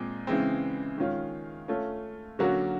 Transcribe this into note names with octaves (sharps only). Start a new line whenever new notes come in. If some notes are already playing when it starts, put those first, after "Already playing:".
Already playing: A#2 G#3 C4
C#3 E3 G#3 C4
D#3 G#3 C#4 F4
A3 C#4 F4
D3 F#3 A#3 C#4 F#4